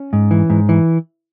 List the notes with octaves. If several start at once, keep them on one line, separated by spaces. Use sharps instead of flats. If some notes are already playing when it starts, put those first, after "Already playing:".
Already playing: C#4
G#2
E3
G#2
E3